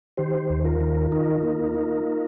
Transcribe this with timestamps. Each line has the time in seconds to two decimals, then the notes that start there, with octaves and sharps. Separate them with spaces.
0.17 D#3 G4 C5
0.50 D#2
0.64 F4 A#4
0.81 D#3
1.11 D#4 F4 A#4
1.43 A#3
1.74 D#4